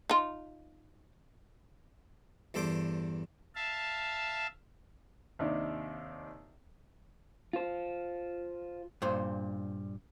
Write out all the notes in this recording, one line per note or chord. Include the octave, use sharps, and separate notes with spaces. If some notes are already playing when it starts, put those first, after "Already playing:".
D#4 F4
E2 G2 A4 C5 D6
E5 F5 A5
D#2 C3 D4 D#4
F4 C5
G2 A#2 C5